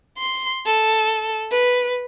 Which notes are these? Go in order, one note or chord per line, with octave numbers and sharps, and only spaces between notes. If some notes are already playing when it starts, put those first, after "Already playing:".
C6
A4
B4